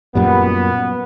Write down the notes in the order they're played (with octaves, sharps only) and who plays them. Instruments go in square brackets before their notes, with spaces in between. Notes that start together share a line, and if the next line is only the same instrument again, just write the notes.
[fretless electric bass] F#2 A#2 G3 [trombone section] B3